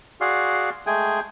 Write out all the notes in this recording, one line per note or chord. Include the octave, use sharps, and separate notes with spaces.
F#4 G#4 D5 F5 C6
G#3 A3 G#4 G5 G#5